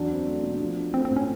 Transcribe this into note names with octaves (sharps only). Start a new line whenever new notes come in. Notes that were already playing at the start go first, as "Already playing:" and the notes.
Already playing: E2 F#3 D4
C4
A3
B2
F3
D4
A3 C4
C4
A2
C#4